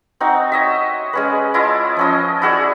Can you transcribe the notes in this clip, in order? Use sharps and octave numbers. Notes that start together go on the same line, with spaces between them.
C4 D#4 F#4
C#5 D#5 E5
G#3 C#4 B4
E4 F4 D#5 A5
F3 C#4 D#5
E4 F#4 G#4 D5